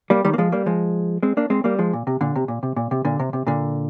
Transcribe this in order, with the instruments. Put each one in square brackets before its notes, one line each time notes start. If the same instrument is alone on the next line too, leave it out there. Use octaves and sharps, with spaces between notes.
[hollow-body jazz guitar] G3 A#3
D#3 G3
A#3
F3 G#3
G3 A#3
F3 G#3
G#3 C4
A#3 D4
G#3 C4
G3 A#3
F3 G#3
A#2
C3
A#2 D3
C3
A#2
C3
A#2
C3
A#2 D3
C3
C3
A#2 D3